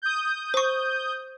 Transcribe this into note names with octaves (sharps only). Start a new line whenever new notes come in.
D#6 G6
C5 C#6